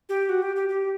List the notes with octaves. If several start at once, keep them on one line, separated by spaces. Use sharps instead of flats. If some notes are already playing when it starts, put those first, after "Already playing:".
G4
F#4
G4
G4
G4